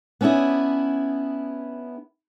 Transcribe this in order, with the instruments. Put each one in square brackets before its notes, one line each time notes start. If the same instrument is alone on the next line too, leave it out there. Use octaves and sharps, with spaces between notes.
[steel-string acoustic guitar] B3 C#4 D4 E4 G#4